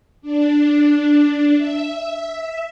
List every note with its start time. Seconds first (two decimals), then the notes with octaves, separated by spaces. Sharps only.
0.22 D4
1.56 E5